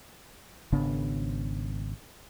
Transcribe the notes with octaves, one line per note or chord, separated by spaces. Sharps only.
G#1 C#3 B3 D4